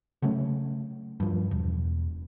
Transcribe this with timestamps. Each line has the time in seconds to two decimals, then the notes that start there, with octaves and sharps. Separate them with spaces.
0.22 C#3 F#3 A3 C#4
1.20 G2 F3
1.51 E1